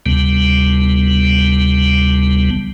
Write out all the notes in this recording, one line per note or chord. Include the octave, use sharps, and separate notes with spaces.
D2 C3 G3 B3